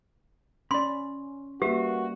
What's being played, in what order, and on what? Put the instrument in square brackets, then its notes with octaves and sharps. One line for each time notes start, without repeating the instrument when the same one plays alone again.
[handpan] C#4 [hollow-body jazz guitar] D5 B5 [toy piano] C6
[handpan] G3 A#3 [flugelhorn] F#4 [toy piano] G4 [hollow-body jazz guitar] B4 E5